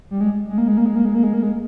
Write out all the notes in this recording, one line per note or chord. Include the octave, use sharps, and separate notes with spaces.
G3
G#3
G#3
A#3
G#3
A#3
G#3
A#3
G#3
A#3
G#3
A#3
G#3